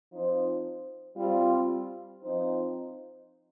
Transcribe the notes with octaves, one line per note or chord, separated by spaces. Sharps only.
F3 C4 D#4 C5
G3 C4 F4
F3 C4 D#4 C5